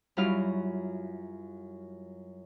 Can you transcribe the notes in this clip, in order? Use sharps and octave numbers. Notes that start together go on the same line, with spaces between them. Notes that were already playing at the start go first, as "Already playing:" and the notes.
F#2 F#3 G3 E4 F4 F6